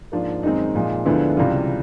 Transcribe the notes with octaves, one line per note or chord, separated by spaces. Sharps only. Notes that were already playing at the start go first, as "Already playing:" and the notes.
G#2 F3 A#3 D4
F#2 D#3 G#3 C4 D#4
A#2 F3 G#3
D2 D3 F3 G#3 B3 E4
C#2 C3 E3 G3 F4